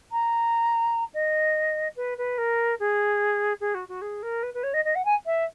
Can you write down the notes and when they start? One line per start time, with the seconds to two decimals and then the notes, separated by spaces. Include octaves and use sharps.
0.12 A#5
1.14 D#5
1.96 B4
2.18 B4
2.38 A#4
2.79 G#4
3.60 G#4
3.74 F#4
3.88 F#4
4.01 G#4
4.23 A#4
4.43 B4
4.54 B4
4.63 C#5
4.74 D#5
4.85 D#5
4.95 F#5
5.05 G#5
5.26 E5